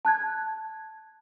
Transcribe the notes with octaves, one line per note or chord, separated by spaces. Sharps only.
A5 F#6 G#6